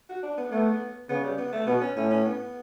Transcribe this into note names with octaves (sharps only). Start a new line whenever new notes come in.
F#4
D4
B3
A3 B3
C#3 B3
G3
B3
A3
B2 B3
C#4
A2 C#4
C#4
B3